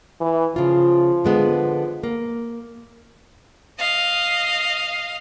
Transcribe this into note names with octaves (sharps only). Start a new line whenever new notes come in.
E3
C#3 F3 F4
D3 G#3 B3
A#3
D#5 F5